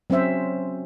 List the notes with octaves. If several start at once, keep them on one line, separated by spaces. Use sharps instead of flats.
F#3 C4 C#4 C5 E5